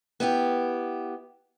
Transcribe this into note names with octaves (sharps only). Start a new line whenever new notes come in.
B3 E4 G4